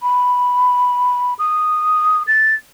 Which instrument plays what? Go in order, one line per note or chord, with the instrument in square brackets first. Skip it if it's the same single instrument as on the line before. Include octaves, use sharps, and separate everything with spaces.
[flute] B5
D#6
A6